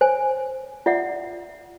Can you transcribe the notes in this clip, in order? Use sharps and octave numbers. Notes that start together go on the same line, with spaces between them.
C5 C#5 G#5
F4 D5 E5 F#5